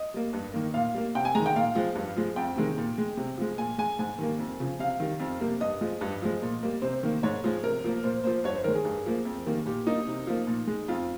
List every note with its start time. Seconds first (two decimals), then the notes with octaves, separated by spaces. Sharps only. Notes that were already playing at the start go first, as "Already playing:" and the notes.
Already playing: D#5
0.14 G3 A#3
0.33 G2
0.54 D#3 A#3
0.74 A#2 F5
0.95 G3 A#3
1.15 C3 G5
1.25 G#5
1.35 D#3 G#3 A#5
1.46 G5
1.55 A#2 F5
1.75 F3 G#3
1.95 G2
2.16 F3 G#3
2.36 F2 G5
2.56 C3 D#3 G#3
2.78 A#2
2.98 G#3
3.17 C3
3.37 F3 G#3
3.58 A#2 G#5
3.78 G#3 G#5
3.99 G#2 G#5
4.18 D#3 G3 A#3
4.39 F2
4.60 C#3 F3
4.79 C3 F5
5.00 D#3 G3
5.20 F2
5.40 C3 G3 A#3
5.60 G2 D#5
5.81 F3 G#3
6.01 G2
6.22 F3 G#3
6.42 A#2
6.63 G3 A#3
6.82 C3 C5
7.03 D#3 A#3
7.23 G#2 C#5
7.44 F3 G#3
7.63 C3 A#4
7.84 F3 A#3
8.03 A#2 C5
8.24 F3 A#3 C5
8.44 G2 C#5
8.55 C5
8.64 D#3 G#3 A#4
8.75 G#4
8.85 G2
9.06 F3 A#3
9.25 F2
9.46 D#3 G3 A#3
9.66 A#2 G4
9.87 G3 A#3 D#4
10.07 C3
10.27 F3 A#3
10.47 A#2
10.67 G#3
10.88 F2 F4